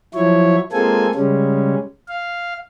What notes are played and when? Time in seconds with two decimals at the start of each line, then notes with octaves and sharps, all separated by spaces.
0.14 F3 F#3 E4 C#5
0.72 G#3 A#3 C4 F4 A4 G#5
1.15 C#3 G3 G#3 C#4
2.08 F5